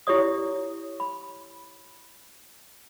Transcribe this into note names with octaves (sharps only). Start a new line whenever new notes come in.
E4 G4 C#5 D5 D#6
B5